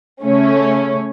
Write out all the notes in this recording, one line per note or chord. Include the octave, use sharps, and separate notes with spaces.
C#3 A3 C#4